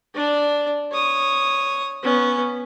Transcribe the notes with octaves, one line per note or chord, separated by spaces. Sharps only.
D4 D5
C#5 D#6
B3 C#4